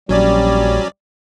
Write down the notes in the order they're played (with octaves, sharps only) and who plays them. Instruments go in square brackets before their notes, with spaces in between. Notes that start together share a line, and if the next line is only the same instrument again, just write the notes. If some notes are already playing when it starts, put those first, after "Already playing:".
[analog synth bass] A#1 [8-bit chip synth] F#3 C#4 D5 [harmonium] G3